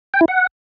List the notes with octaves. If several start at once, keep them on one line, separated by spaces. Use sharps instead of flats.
G5
E4
F#5